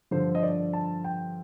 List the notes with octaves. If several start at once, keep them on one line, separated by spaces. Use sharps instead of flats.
G2 D3 F3 C5
D#5
D5
A5
G5